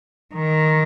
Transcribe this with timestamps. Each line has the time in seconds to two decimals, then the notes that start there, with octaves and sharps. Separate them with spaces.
0.34 D#3